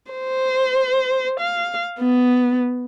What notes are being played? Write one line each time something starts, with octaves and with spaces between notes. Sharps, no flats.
C5
F5
B3